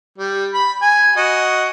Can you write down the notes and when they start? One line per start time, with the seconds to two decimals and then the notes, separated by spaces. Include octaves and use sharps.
0.18 G3
0.54 B5
0.82 G#5
1.17 F#4 D#5